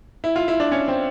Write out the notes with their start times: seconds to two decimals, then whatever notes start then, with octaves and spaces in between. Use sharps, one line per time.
0.24 E4
0.36 F4
0.48 E4
0.60 D4
0.72 C#4
0.88 C4